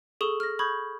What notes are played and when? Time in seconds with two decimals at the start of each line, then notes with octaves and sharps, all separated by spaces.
0.21 G#4 A4 C#6 D#6 E7 G7
0.40 F6 A#6
0.59 B5 C#6 D#6 G6 G#6